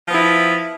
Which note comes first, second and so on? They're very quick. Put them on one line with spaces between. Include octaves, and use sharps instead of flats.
F3 B3 E4